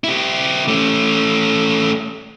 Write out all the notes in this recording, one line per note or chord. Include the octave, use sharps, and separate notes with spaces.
E4 G4
A3 C#4